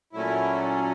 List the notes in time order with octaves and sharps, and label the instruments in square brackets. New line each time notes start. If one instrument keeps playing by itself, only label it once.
[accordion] A#2 F#3 A3 C#4 E4